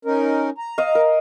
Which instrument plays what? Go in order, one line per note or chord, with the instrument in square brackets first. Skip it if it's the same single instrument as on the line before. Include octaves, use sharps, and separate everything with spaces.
[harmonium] C#4 D#4 A#4
A#5
[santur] D#5 F5
A#4